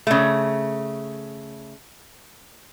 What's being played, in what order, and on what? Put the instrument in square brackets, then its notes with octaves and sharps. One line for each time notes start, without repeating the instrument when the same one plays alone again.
[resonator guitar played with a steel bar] C#3 A3